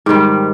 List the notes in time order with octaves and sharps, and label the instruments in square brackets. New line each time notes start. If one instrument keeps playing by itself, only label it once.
[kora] G#2 D#3 G3 G4